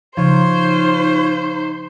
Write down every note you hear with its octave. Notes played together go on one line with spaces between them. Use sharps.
C#3 F3 D#4 F4 C5 C#5